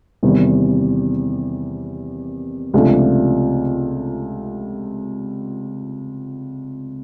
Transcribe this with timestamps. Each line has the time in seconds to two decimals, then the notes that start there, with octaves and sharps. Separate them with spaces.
0.23 E2 C3 D#3 G3
2.74 C#2 C3 F3 A3 D4